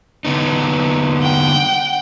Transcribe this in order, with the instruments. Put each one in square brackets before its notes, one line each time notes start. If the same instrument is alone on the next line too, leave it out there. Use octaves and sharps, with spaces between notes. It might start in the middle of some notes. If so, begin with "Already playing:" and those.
[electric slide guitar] D3 B3 D#4
[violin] F#5 G5